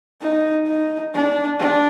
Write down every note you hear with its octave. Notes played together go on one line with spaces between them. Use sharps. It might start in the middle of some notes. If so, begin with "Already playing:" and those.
D#4
D#4
D4
D4